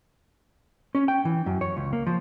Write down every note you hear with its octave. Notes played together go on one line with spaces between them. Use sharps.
C#4
G5
E3
F#2
C#5
C#2
A#3
F3